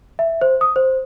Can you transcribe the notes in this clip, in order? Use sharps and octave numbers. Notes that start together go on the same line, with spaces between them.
E5
C5
D#6
C5